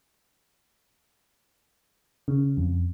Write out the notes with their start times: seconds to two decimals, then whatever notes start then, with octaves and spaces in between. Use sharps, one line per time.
2.28 C#3
2.57 F2